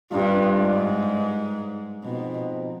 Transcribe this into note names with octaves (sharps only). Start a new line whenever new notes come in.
G2 C3 G3 D4 F4
G#2
G#2 B2 F3 C4 D#4